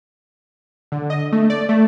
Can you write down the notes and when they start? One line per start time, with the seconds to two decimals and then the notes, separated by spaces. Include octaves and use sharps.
0.92 D3
1.10 D#5
1.32 A3
1.50 D5
1.69 A3